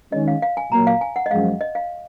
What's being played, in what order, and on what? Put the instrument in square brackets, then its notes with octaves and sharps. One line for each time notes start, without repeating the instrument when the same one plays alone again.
[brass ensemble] D#3 G#3 C#4 [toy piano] D#5
[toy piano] F5
F5
G#5
[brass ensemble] A#2 F#3 A#3 [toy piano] A#5
[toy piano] F5
G#5
F#5
D#5
[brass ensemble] F#2 F3 G#3 [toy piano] F5
[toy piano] D#5
F5